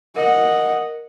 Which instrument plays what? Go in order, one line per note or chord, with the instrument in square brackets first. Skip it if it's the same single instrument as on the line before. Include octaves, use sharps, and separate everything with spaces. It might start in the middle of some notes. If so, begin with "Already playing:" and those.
[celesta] A#4 [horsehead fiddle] D#5 F#5